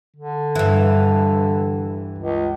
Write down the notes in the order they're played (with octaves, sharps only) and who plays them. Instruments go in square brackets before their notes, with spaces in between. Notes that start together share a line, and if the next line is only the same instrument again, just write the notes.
[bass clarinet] D3
[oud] G2 E3
[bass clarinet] C#2